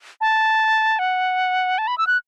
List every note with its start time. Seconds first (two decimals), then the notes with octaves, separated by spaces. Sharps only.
0.21 A5
0.99 F#5
1.78 A5
1.87 B5
1.98 E6
2.07 F#6